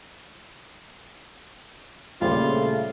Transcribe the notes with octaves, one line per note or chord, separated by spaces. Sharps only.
A#1 C#3 G3 A3 F4 C5